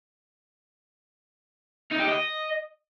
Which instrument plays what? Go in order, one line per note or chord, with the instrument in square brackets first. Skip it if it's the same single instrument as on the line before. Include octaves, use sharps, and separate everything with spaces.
[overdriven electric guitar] D#4
G4
D#5